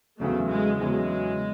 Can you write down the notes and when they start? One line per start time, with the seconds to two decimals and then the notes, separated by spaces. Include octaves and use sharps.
0.20 E2 C#3 F#3 A3
0.51 G#3
0.81 E2 C#3 F#3 G#3